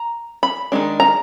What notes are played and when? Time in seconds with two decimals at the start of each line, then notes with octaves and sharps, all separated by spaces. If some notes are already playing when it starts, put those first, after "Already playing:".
Already playing: A#5
0.43 B5
0.72 D#3 G#3 D4
1.00 A#5